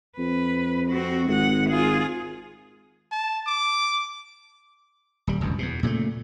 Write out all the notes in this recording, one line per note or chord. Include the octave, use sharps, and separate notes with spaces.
F2 B4
C4 F#4
G#1 G#3 F#5
F4 G#4
A5
D6
D#1 G3
F1 C#2 G2
E2 B2
A#2 C#3 G#3 A3